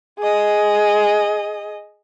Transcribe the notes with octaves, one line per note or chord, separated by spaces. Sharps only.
G#4 D#5